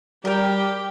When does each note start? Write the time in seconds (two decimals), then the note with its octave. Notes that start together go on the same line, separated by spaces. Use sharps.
0.25 G3 G4 A#4 G5